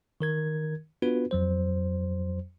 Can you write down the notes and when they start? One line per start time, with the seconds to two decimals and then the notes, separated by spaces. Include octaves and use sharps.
0.21 D#3 A#4 G#6
1.02 B3 D4 F4 F#4 B4
1.31 F2 F#3 C5